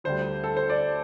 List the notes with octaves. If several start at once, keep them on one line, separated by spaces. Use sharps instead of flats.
D2 D3 G3 C5
A4
C5
D5